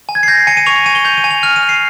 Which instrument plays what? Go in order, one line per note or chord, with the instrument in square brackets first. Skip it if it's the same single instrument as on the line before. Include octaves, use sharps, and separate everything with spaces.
[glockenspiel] G#5
G#6
C7
G6 A#6
C7
G#5 C#7
D#7
C#6 F7
G#5 D#7
G7
G6 F7
D#7
G#5
F7
F6 F7
D#7
F6
C7